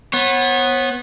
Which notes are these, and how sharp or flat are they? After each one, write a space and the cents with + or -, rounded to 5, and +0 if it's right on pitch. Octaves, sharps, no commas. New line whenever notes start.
B3 +0 C#5 -40